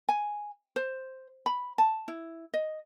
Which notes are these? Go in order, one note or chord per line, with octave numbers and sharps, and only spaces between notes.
G#5
C5
B5
A5
E4
D#5